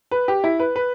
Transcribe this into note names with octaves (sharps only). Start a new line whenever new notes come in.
B4
G4
E4
B4
B4